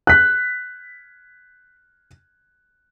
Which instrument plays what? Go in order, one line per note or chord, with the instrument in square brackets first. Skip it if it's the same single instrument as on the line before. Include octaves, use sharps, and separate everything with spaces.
[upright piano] F#6 B6